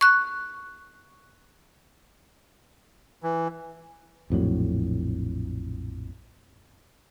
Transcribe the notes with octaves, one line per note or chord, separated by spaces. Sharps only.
C#6 F#6
E3
A#1 F2 A2 F#3